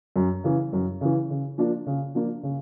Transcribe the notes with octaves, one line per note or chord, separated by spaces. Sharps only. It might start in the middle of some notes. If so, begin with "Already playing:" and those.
F#2
C#3 E3
F#2
C#3 E3
C#3
F3 A#3 D4 F4
C#3
F3 A#3 D4 F4
C#3